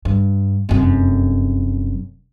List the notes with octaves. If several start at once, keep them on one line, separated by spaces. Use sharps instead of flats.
G2
F1 F#2